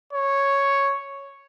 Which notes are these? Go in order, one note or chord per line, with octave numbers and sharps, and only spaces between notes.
C#5